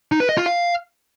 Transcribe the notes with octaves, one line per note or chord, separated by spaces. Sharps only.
D#4
B4
D#5
F4
F5